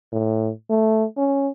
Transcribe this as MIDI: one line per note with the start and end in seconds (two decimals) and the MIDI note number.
0.13 0.51 45
0.70 1.05 57
1.18 1.49 61